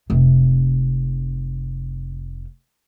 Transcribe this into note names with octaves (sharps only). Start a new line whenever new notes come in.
F1 C3